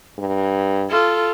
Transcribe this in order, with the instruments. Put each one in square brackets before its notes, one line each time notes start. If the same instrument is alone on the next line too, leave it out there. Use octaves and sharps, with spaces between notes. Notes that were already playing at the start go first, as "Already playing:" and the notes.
[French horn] G2
[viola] F4 A4